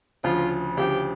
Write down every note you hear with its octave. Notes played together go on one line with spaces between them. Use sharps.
D2 C#3 F3 F4
D2 C#3 F3 G4